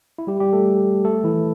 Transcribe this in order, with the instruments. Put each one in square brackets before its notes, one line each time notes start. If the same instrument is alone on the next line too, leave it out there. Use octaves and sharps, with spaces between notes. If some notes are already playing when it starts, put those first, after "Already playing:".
[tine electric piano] E4
G3 G4
G3 G4
A3 A4
A3 A4
E3 E4